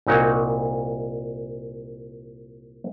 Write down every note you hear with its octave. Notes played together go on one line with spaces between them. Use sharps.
C2 A#2 D#4 F#4 C#5